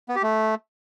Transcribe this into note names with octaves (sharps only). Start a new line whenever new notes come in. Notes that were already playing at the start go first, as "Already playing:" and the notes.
B3
G4
A3